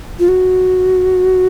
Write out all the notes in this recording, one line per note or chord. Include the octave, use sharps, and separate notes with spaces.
F4
F#4